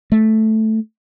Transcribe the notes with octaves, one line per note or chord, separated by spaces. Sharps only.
A3